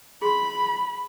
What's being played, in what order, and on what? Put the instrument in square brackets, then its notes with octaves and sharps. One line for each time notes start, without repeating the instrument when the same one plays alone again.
[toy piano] G#4 C6 [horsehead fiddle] B5